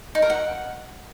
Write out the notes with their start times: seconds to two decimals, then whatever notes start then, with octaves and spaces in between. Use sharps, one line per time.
0.15 D#4
0.22 A#4
0.30 F#5